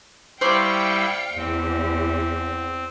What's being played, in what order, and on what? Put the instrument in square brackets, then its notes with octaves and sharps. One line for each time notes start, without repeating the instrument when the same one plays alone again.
[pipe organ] G3 E4 [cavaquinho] C5 D5 C#6 [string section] F5 G5 C#7
[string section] E2 [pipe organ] C4